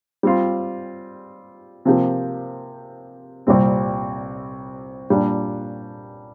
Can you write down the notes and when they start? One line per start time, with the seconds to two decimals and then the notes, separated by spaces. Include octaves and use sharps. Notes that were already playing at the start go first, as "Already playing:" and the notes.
0.23 G3 C4 F4
1.85 C3 F3 A#3 G4
3.47 C2 A#2 G3 C4
5.10 A#2 G3 D4